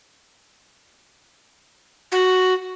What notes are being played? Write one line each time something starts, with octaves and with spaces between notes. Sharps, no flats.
F#4